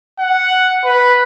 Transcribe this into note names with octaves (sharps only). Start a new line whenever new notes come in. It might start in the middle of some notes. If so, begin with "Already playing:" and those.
F#5
B4